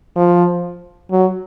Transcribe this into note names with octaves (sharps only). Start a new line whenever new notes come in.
F3
F#3